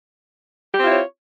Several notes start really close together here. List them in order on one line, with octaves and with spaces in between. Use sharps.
G4 C4 F4 E4 C#5